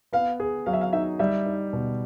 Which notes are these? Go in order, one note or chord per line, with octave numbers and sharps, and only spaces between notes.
B3 F5
G#4
F#3 F5
E5
F5
D#4 E5
G3 E5
D#4
B2